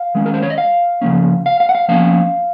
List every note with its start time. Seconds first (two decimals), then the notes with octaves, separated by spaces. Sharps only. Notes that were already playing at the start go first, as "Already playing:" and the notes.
Already playing: F5
0.15 D#3 G#3 C#4
0.26 A#4
0.34 C5
0.42 C#5
0.50 D#5
0.58 F5
1.01 C#3 F3 A#3 C#4
1.46 F5
1.60 F5
1.69 F#5
1.75 F5
1.88 F3 A#3 C#4 F5